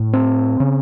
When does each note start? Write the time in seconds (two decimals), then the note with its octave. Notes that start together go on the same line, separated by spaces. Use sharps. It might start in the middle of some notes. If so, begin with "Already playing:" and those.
Already playing: A2
0.13 C4
0.60 C#3